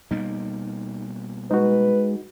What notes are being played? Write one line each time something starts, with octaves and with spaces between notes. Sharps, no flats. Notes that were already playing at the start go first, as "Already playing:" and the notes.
B2 G3 A#3 D#4
G#3 D#4 F#4 B4